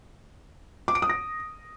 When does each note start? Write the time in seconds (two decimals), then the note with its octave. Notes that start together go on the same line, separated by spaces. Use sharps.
0.88 D6
0.95 D7
1.02 D#6
1.10 A#6